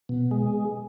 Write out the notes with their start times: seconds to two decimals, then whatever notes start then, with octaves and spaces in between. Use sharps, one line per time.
0.09 B2
0.31 G#3